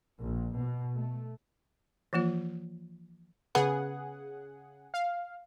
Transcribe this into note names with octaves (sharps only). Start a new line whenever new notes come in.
A#1
B2
A3
E3 F3 A#3 F4
C#3 B3 G#4 F#5
F5